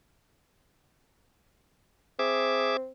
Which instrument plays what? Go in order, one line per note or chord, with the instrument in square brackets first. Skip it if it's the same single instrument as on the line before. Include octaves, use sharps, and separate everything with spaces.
[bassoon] C4 [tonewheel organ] G#4 E5 D6